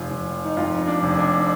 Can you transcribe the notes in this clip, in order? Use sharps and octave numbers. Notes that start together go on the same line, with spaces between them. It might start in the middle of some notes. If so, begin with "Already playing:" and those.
Already playing: F1 F4
F1
D#4
F2 F4
D4
F1
D4